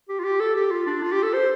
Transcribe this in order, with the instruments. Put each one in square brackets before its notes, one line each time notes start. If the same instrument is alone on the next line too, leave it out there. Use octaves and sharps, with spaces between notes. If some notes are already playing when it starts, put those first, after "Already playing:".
[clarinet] G4
F4
G4
A4
G4
F4
D4
F4
G4
A4
C5